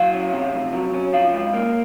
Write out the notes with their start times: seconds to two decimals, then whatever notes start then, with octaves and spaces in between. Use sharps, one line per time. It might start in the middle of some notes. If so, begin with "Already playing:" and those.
Already playing: F#3 F5
0.14 C#4
0.33 C3
0.54 F2
0.73 F#3
0.94 C#4
1.13 F3 F5
1.33 G#2
1.54 A#3